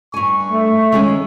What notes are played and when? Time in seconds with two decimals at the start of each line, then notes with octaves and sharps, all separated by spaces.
0.14 G2 G#5 C#6
0.50 A3 E5
0.92 D#3 G#3 C#4